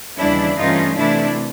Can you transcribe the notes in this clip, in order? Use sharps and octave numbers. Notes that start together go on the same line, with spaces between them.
D#2 C#3 E3 G3 D4 E4
G2 E3 A3 C#4 D#4 F4
C3 E3 A3 D4 E4